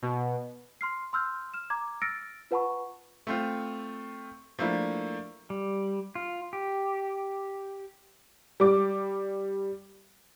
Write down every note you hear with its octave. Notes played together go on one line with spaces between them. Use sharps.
B2
C6 F6 C7
C6 E6 F6 G6
F6 E7
A#5 D6 G#6
E6 F6 A6 A#6 C#7 D7
F4 B4 F#5 A5 B5 C#6
A3 C4 F4
F3 A3 A#3 D4 E4
G3
F4
G4
G3 D6